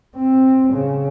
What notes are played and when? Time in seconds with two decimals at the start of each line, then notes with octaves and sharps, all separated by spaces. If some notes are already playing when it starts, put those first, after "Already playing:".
0.16 C4
0.73 C#3